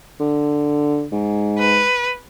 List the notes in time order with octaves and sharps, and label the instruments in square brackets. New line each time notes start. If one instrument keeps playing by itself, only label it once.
[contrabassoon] D3
G#2
[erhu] B4